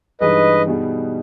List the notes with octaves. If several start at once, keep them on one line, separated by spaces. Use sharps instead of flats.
G2 E3 G#3 D#4 G#4 B4 D#5
B2 G3 B3 D#4 G#4